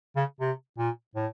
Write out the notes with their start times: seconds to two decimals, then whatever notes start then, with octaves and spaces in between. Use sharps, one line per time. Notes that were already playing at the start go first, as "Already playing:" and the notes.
0.16 C#3
0.40 C3
0.78 A#2
1.15 A2